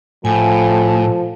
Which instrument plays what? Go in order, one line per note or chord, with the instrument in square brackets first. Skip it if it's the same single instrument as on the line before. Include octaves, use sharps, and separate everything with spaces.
[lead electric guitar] A2 [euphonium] F3 [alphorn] A4 [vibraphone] G#5